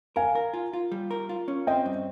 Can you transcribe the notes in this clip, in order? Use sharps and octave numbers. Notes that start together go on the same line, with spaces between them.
A#4 F5 G#5
A#4
F4
F4
G3
A#4
F4
C#4
C4 D#5 G5
G2